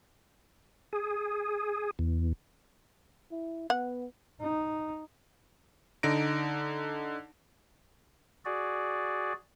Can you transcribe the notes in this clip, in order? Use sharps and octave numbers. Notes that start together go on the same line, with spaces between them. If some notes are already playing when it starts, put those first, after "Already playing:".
G#4
E2
E4
B3 F#5
D#4
D3 D#4 A#6 D7
F#4 G#4 D5